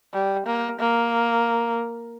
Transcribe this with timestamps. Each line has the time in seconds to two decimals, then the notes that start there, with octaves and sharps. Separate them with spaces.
0.13 G3
0.46 A#3
0.80 A#3